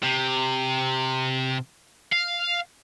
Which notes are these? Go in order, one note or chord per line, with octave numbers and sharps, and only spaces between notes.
C3
F5